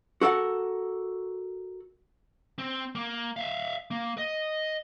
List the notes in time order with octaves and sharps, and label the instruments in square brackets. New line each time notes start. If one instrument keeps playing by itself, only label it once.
[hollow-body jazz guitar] F#4 A4 A#4 F#5
[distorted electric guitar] C4
A#3
E5 F5
A#3
D#5